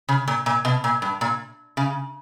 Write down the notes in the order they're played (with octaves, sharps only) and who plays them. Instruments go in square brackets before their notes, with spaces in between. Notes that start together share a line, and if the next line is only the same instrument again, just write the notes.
[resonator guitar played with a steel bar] C#3
A#2
A#2
B2
A#2
G2
A#2
C#3